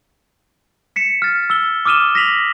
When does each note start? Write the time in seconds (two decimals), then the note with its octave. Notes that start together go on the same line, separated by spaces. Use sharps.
0.96 B6 C#7 E7
1.22 F6 A6
1.50 E6 G7
1.86 D6 D#6 F6 D#7 E7 G7
2.15 A#6 B6 F7 F#7